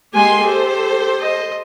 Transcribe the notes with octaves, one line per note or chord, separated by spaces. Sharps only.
G#3 A#3 G4 G#5 C6
G4 A4 C5
D#5